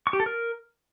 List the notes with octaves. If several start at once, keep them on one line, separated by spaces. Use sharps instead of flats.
C#6
G4
A4
A#4